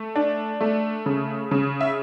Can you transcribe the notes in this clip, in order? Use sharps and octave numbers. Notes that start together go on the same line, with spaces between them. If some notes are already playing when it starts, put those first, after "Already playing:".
Already playing: A3
D4
A3
C#3
C#3
E5